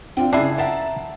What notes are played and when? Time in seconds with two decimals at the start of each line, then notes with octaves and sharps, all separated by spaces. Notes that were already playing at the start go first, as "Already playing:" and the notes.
0.17 C4 D4 F4 G5
0.33 C#3 D4 E4 G#4 A5 D#6 C7
0.58 A#4 E5 F#5 A5